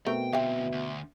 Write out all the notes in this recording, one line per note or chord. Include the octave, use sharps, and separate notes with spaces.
B2 A3 C4 A#4 G5
D2 C4 E5 F5 G5
D2